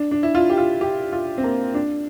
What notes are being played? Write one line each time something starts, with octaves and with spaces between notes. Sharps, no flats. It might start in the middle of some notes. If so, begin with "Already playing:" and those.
Already playing: D4
D4
E4
F4
G4
F4
G4
F4
C4
A#3
D4